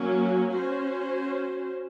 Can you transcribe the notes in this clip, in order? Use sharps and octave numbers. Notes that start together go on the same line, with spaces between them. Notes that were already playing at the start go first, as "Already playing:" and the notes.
Already playing: F#3 A#3 C#4
C#4 F#4 C5